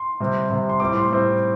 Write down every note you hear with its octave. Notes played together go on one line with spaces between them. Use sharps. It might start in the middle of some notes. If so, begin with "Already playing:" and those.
Already playing: C6
C3 G3 C4
C3 G3 C4
C6
A2 G3 C4 D6
C6
A2 G3 C4